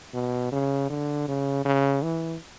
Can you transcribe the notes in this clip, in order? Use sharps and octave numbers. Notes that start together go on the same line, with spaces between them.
B2
C#3
D3
C#3
C#3
E3